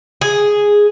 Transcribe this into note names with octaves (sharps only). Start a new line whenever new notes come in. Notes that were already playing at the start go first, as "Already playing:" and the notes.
G#4